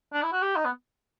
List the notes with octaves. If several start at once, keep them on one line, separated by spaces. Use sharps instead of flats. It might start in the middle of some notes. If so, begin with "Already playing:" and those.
D4
E4
F#4
G4
D#4
B3